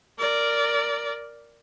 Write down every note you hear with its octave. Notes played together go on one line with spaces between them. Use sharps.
A#4 D5